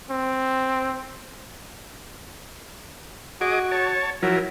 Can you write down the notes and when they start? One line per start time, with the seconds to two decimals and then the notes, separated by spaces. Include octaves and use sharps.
0.10 C4
3.41 F#4 G#4 D#5 D6
3.71 C#5 A5
4.22 F3 F#3 E4 A#4